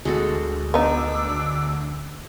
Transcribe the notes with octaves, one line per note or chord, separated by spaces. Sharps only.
D2 G#3 F#4 A4
B3 D4 D#4 D6 E6